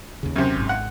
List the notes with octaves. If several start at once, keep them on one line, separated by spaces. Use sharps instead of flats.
D#2 C#3
F#2 C3
G#1 G#2
F#5